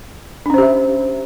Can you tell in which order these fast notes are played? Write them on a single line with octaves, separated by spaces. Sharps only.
D4 C#4 C5 G4 E5